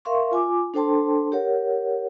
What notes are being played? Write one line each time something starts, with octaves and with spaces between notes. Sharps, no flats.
A#4 E5 F5 C6 C#6
F4 G#5 D6
D4 A4 C5 G5 A5 C6
G4 A#4 C#5 F#5